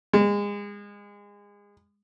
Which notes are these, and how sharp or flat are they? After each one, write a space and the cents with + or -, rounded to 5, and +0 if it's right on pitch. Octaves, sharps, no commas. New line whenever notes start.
G#3 -30